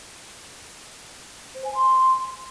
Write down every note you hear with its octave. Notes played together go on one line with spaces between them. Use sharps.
C5
G#5
C6